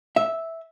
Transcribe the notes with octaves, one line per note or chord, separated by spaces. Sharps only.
E5